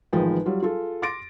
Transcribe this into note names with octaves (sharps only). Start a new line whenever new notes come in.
A1 D#3 F3 G#3 B4 G5
F#3 G3 F4
F4 G#4 A4
C6 D6 A6 A#6 D7